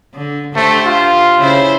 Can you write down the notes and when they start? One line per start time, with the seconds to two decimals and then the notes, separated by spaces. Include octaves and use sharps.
0.14 D3
0.56 D3 A3 G4 C5
0.86 F4
1.38 C#3 E4 C5